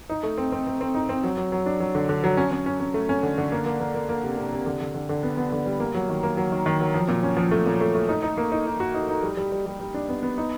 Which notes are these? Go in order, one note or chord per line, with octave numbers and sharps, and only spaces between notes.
D#4
A3
C4
C4
C4
C4
D#4
C4
F#3
F#3
F#3
D4
F#3
D3
D3
F#3
C#4
C#4
C#4
C#4
A3
C#4
D3
D3
A#3
A#3
A#3
A#3
A#3
C3
C3
C3
D3
D3
D3
D3
B3
B3
D3
G3
A#3
F#3
D#3
A#3
F#3
D#3
D#3
F#3
F3
A#2
C#4
F3
A3
A#2
A3
A3
D#4
D#4
A#3
D#4
D#4
F#4
D#4
D#4
G3
G3
G3
G3
G3
D4
B3
B3
D#4